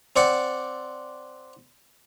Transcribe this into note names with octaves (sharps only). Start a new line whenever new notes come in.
C4 D5 F#5